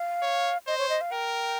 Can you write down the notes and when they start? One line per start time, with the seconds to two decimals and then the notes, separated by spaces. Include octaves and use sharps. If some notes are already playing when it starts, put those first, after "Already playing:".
Already playing: F5
0.22 C#5
0.67 C5 D#5
0.78 C#5
0.89 D#5
1.01 F5
1.12 A#4 G5